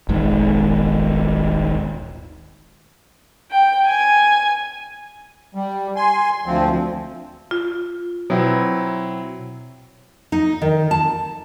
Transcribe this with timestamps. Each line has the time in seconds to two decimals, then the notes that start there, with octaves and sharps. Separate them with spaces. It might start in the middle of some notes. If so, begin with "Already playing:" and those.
0.09 D#1 G#1 G#2
3.51 G5
3.87 G#5
5.55 G3
5.96 G#5 C6
6.46 D2 F3 C4
7.51 F4
8.30 B2 F#3 C4 E4
10.32 D#4
10.62 D#3
10.91 A5